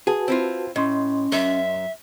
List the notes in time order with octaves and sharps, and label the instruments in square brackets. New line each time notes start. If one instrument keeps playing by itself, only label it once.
[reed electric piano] F#4 B4 A5 [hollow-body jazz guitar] G#4
[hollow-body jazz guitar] C4 E4 F4
[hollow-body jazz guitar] A2 [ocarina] C#4 [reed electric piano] D#5 C6
[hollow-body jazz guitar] F#2 [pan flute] E5